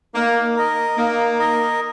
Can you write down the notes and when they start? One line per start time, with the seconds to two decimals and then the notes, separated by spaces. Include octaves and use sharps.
0.14 A#3 D#4
0.56 A#4 D#5
0.97 A#3 D#4
1.39 A#4 D#5